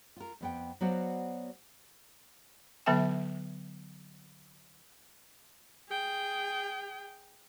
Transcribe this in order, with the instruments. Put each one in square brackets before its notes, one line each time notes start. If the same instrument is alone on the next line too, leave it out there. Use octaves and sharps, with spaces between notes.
[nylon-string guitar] F4 A#4
F2 B3 G5
F#3 B3 F#4 C5 D5 F5
[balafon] D3 F#3 B3 A4 E5 G5
[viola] G#4 G5